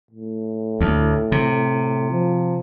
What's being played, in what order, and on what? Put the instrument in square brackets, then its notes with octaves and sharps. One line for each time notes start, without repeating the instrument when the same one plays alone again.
[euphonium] A2
[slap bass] D2
C3
[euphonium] F3